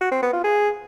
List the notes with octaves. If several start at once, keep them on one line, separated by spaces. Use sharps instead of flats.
F#4
C4
B3
F4
G#4